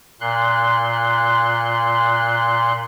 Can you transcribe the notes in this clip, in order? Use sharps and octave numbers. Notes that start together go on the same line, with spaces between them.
A#2 C6 F#6